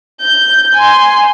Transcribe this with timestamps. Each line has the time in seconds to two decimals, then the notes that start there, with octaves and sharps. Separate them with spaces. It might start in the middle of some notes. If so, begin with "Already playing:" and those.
0.21 G6
0.75 G#5 C6